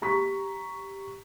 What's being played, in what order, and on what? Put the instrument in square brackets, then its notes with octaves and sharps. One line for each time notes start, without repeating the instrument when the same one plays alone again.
[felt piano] G4 A#5 C#6 B6